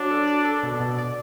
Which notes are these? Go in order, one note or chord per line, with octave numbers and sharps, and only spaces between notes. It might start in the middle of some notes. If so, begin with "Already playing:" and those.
Already playing: F#3 D4
A4
D5
A4
B2
B2
D5